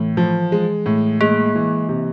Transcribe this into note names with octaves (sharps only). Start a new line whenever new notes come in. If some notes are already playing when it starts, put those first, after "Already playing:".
Already playing: A2 E3
F3
G#3
A2
G#3 A#3
E3
C3